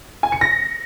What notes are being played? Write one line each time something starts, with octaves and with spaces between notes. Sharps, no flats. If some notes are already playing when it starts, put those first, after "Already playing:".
G#5
C#7
A#6